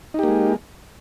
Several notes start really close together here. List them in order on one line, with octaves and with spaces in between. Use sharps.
D#4 G4 A#3 G#3